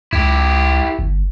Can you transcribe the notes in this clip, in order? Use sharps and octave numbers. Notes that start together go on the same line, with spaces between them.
C#2 E4 G4
G1